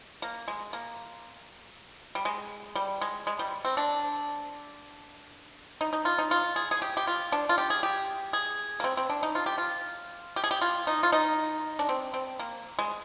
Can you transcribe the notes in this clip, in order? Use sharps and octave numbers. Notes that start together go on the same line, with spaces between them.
A#3
G#3
A#3
G3
G#3
G3
G#3
G#3
G3
C4
D4
D#4
D#4
F4
D#4
F4
G#4
G#4
G4
G4
F4
D4
F4
G4
G#4
G4
G#4
A#3
C4
C4
D4
D#4
F4
G4
F4
G4
G#4
G4
F4
D#4
F4
D#4
D4
C4
C4
A#3
G#3